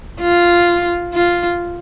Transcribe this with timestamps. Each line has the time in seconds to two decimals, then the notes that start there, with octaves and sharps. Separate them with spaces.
0.21 F4
1.13 F4